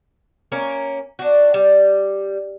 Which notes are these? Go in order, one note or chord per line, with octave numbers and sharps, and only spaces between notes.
A#3 C#4 A#4
D4 F#4
G3